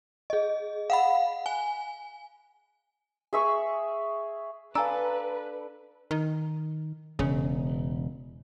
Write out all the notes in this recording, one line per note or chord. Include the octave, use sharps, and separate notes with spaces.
G#4 D#5
F5 F#5 B5
G#5
G#4 E5 C#6
D4 A4 B4 F5 G#5 A#5 E6
D#3
E1 C#3